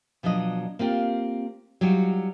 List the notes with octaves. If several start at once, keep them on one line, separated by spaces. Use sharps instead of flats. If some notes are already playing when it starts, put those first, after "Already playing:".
B2 F3 F#3 D4 D#5
A#3 C4 F4 G4
F#3 G3 D#4 F4 F#4